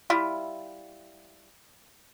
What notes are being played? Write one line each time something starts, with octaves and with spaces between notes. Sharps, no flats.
G3 E4 F4